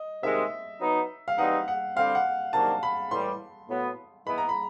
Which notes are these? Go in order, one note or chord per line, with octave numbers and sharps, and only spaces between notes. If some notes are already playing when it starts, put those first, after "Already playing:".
Already playing: D#5
C3 D#3 G#3 E5
F#3 B3 D#4
F5
E3 G3 C4 D#4 F#5
F#5
D3 G3 C4 F5
F#5
C3 D#3 F#3 A#3 D4 A5
B5
A2 E3 G3 C6
A2 F#3 B3
E3 G#3 B3 E4 B5
A#5
B5